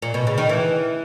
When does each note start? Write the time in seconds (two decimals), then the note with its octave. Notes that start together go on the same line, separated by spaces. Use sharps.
0.02 A#2
0.14 B2
0.27 C#3
0.38 D#3
0.49 E3